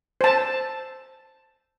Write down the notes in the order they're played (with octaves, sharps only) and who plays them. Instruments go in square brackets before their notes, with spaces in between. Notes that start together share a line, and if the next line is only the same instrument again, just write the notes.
[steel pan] C5 A5